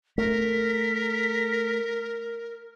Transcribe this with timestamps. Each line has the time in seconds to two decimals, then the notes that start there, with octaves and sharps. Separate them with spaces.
0.18 A3 A#4 B6